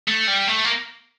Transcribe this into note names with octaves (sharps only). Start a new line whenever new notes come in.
A3
G3
A3
A#3